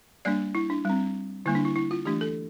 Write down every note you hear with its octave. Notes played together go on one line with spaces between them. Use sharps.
G3 A#3 D4 D5
E4
D4
G3 C4
D3 G3 A#3 E4
D4
E4
E4
F4
E3 A3 D4 G4
A4